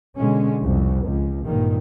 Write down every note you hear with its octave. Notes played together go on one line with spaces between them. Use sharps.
B2 D3 G#3 C#4
C2 F2
C#2
G#1 G2 A#2 D#3